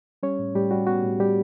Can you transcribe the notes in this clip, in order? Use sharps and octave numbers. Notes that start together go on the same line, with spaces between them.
G3 C#4 C#5
A2
A2 G3 G4
G3 F#4
B3 F#4
A2
A2 G3 G4